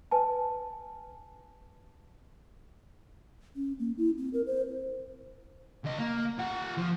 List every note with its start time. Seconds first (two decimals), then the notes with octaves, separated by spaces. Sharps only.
0.11 B4 G#5 A5
3.56 C#4
3.79 A#3
3.98 E4
4.18 C4
4.33 A#4
4.46 C5
5.85 C#2 D#5
5.99 A#3
6.39 F4 F#5
6.77 F3